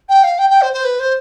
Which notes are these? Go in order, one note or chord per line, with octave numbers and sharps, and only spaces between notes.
G5
F5
G5
G5
C5
C5
B4
C5